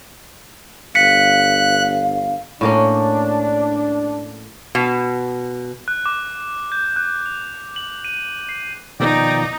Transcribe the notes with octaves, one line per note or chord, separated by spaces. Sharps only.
G1 F5 F#6 B6 C#7
A2 A#3 C#4 D4
B2
F#6
D6
G6
F#6
F7
F#7
D#7
C7
B2 D#3 F3 D#4 D5 G5